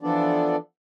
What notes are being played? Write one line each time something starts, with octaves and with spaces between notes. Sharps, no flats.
E3 F3 B3 D4 A4 D5